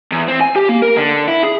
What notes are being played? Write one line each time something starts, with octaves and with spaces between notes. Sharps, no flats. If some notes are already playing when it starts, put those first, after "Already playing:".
E2
C4
G#5
G4
A#3
A#4
D3
E4
G#4